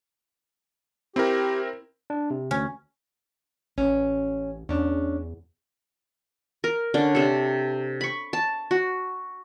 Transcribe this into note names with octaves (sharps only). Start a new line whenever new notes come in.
C4 E4 G4 A#4
D4
C3
D2 C#4
A1 C#4
E2 C#4 D4
A#4
D3 C#4 D4
C3 A4
B5 C#6
A5
F#4